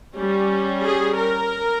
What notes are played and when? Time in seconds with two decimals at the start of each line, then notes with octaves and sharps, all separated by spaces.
0.17 G3 C#4
0.85 G#4
1.18 A#4